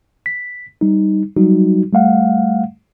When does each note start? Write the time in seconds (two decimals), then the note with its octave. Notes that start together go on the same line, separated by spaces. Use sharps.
0.26 B6
0.81 G3 D#4
1.37 F#3 G3 D#4 F#4
1.93 G3 A3 F5 F#5